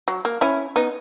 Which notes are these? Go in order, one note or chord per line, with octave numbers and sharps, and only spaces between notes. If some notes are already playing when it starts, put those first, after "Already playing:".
F#3
A#3
C#4 E4
B3 D#4